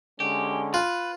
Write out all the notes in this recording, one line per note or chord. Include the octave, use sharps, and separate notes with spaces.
D3 G#3 C#4 G4
F4 B4